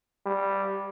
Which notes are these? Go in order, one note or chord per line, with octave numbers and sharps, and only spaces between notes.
G3